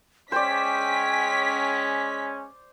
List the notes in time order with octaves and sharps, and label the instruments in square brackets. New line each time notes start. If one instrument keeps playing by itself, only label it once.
[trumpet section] G#3 C#4 [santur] C5 D5 [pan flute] G5 [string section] B6